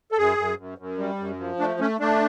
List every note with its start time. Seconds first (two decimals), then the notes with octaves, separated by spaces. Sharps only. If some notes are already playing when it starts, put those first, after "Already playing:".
0.12 A4
0.18 F#2 G#4
0.38 F#2
0.58 F#2
0.78 F#2
0.98 G3
1.19 F#2
1.40 F3
1.59 A3 D4
1.80 A3 C#4
2.00 A3 D4